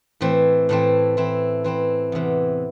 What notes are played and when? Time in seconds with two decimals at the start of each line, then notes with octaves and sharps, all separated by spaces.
0.21 A2 E3 A3 C4
0.69 A2 E3 A3 C4
1.17 E3 C4 E4
1.64 E3 C4 E4
2.12 E2 C3 E3